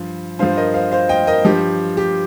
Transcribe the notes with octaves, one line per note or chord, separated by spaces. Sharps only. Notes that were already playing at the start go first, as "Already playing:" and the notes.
Already playing: G2 F3
G2 F3 C5 F5
A#4 D#5
C5 F5
C5 F5
D#5 G5
A#4 D#5
G2 F3 G4
G4